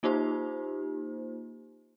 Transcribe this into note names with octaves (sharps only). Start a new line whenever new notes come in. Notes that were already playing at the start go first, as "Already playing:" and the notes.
A#3 D#4 F4 G4 C5